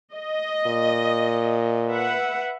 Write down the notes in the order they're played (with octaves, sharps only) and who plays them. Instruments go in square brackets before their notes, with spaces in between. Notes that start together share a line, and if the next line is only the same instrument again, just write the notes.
[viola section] D#5
[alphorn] A#2
[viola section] B4 E5 F#5